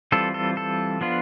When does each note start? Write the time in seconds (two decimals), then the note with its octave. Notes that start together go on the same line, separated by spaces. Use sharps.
0.12 E3 G3 C4 F4 A4
0.34 A4
0.57 A4
1.01 F3 B3 D4 F4